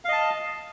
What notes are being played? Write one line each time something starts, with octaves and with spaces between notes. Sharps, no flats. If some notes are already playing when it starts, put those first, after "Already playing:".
D#5 F5 A5